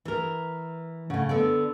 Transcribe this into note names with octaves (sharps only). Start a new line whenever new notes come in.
E3 A#4
A2 C#3 F#5
D3 B3 A4 D5